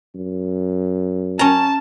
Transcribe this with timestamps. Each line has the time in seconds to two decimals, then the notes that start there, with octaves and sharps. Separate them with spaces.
0.15 F#2
1.39 C#4 A5 A#5